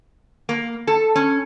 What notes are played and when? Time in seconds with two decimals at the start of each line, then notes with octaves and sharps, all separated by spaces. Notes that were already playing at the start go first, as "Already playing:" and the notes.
0.49 A#3
0.87 A4
1.16 C#4